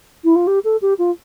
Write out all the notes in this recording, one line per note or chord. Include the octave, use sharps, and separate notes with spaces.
E4
F4
G4
A4
G4
F4